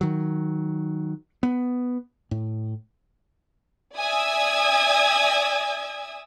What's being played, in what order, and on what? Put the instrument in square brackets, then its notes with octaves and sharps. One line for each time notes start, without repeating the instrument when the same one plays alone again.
[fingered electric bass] D#3 F#3
B3
A2
[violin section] D5 E5 G#5 D#6 E6 G#6